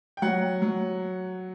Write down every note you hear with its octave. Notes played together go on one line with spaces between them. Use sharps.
G5
F#3 F#5
F#3